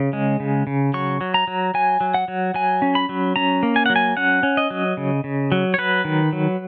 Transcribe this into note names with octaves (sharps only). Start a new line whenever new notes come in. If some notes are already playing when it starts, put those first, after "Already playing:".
Already playing: C#3
G#3
C#3
C#3
F#3 C#6
F#3
A#5
F#3
F#3 G#5
F#3
F#5
F#3
F#3 G#5
C#4
B5
F#3
C#4 A#5
A#3
G#5
F#3 F#5
G#5
C#4 F#5
C#4
D#5
F#3
C#3
C#3
F#3
C#5
F#3 B4
D#3
F#3